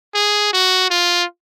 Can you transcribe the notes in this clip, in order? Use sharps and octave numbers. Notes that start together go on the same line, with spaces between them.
G#4
F#4
F4